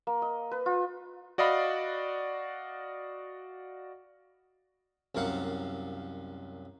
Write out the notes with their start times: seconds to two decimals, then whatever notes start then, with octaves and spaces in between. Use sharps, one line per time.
0.07 A#3
0.22 D#5
0.51 B4
0.66 F4
1.38 F#4 D5 D#5 F5 B5
5.15 C2 F#2 A#3 F5 F#5